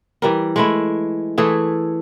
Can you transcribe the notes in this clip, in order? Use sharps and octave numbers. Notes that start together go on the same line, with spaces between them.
E3 G3 A#4
G#3 A3 E4
E3 A3 G#4 A4